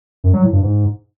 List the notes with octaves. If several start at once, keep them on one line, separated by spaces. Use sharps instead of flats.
F#2
F#3
A2
G2
G#2